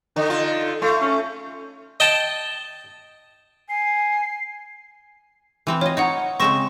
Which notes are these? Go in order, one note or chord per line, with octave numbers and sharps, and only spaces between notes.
D3 D#4
D3 F4
A3 F4
C#4
D#5 G5 A5
G#5 C7
E3 C4 G5
F4 C#5 D#5
D#4 C#5 D#5 F#5 A#5
C#3 G#3 C4 C#6 A#6 E7